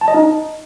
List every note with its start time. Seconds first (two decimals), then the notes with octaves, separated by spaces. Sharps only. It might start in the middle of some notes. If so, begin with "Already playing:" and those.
0.01 A5
0.08 D#5
0.14 D#4